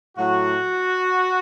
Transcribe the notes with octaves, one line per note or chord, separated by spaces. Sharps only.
A2 F#3 F#4